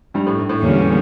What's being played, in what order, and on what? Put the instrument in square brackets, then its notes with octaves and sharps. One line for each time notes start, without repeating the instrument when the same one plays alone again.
[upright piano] G2 G3
A2
G2
A2
[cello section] E2 D3 G3 A#3 C#4